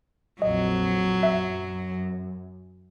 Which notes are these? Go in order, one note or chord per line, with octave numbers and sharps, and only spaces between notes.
A#1 F2 F#3 D#5
F#2 E5